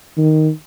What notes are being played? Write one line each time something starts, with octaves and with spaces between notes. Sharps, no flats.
D#3